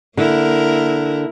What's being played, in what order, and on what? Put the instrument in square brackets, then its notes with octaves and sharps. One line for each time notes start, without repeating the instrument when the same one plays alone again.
[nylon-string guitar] D3 [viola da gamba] A#3 E4 A#4